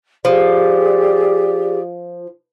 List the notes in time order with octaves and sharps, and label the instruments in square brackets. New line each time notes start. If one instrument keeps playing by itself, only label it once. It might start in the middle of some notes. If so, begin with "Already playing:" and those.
[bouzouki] F3 [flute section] G4 G#4 D5